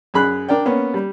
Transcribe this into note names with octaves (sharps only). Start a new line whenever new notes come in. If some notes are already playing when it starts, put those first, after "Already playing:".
F#2 G#4 B5 F#6
D4 A#4 D5 G5
A#3 B3 C#4
G3